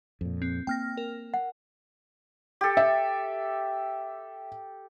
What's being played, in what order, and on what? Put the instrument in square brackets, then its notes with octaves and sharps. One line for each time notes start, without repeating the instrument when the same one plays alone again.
[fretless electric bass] F2 A#2
[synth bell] C4
[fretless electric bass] A#3 C4 [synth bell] G5 F6 A#6
[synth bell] A#4
[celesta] F#5
[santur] G4 A4
[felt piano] E5